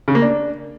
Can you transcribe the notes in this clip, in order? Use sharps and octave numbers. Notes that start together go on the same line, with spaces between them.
C#3
A#3
D4